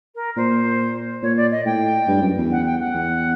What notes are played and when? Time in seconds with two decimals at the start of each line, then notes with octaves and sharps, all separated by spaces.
0.15 A#4
0.36 A#2 C5
1.22 A#2 C#5
1.36 D5
1.51 D#5
1.65 A2 G5
2.08 G2
2.22 F#2
2.37 E2
2.51 F#5
2.65 G5
2.80 F#5
2.95 E2